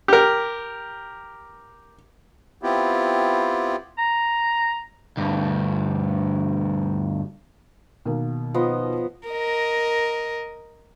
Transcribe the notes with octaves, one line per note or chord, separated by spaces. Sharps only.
G4 A#4
B3 C4 E4 F4 G4
A#5
D2 G2
B2 D#3 A#3
F3 B3 D#5
A#4 D#5